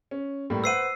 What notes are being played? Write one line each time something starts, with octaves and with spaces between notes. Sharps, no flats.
C#4
A2 G3 A#3
B4 C5 F#5 E6 C7 D#7